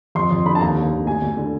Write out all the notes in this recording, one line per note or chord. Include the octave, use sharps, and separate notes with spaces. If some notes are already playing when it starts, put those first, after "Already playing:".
F2 C6
F2
D3 B5
A5
D#2 A#5
D#2
D3
D2 G#5
D2
D3